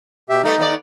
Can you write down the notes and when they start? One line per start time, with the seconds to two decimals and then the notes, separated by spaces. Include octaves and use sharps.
0.29 B2 G4 E5
0.43 G3 A3 B3 D#4
0.58 D#2 B3 D5